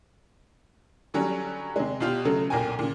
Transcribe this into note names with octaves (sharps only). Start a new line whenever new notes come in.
D3 F#3 G3 C#4
C3 G#3
B2 F4 G4
C#3 F#3 A3 A4
B1 A#2 A#4 G5 G#5
A#2 C#3